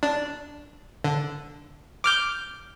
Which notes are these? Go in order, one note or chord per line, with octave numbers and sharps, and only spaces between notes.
D4
D3
D6 F6 G6